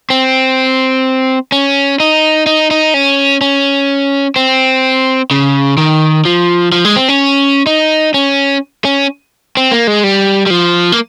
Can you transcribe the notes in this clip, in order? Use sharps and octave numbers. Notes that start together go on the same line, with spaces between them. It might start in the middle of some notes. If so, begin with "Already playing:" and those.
C4
C#4
D#4
D#4
D#4
C#4
C#4
C4
C#3
D#3
F3
F3
G#3
C4
C#4
D#4
C#4
C#4
C4
A#3
G#3
G3
G3
F3
A#3